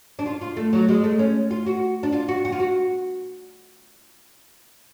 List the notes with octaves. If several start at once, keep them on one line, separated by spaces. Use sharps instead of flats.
D4
F4
F4
A3
F#3
G#3
A3
C#4
F4
F#4
D4
F4
F#4
F#4
F4
F#4